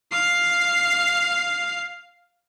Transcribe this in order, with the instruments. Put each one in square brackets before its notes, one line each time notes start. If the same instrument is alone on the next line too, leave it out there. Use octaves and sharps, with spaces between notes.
[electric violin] F5 C7